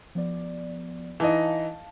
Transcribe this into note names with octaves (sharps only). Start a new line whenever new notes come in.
F3 B3 D5
E3 D#4 D#5 F5 A5